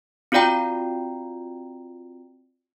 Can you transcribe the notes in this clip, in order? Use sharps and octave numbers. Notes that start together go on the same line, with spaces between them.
C4 F4 F#4 D5 G5 A#5